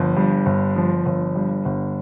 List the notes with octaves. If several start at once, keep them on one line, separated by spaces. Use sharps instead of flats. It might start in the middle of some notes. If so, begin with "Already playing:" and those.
Already playing: G1 F3
G2
G1
F3
G1
G2
G1